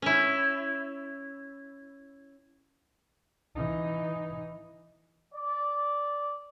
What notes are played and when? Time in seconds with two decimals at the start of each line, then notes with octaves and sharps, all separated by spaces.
0.02 C#4 E4
3.56 E3 D#4
5.33 D5